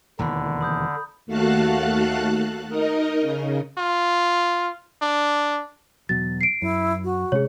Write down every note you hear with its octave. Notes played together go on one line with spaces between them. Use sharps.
E1 D#2 D3 E3 A#5 B5
B5 D#6 G6
D#2 A3 F#4 F5 A5 F#6
D#4 A#4 D#5
C#3
F4
D4
E2 B2 F#3 A6
C7 D7
F#2 E4
F#4
C3 G#3 C#4 G#4 C#5